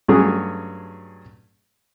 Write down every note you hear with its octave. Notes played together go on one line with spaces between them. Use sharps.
G2 F#3 A3 C#4 G#4